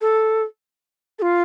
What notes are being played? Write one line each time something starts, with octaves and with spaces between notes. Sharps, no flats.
A4
A4
F4